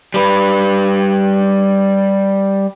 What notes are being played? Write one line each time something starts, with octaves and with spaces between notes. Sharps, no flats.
G3 B4